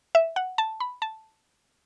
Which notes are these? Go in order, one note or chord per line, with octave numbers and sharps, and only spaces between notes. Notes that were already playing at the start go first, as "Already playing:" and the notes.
E5
F#5
A5
B5
A5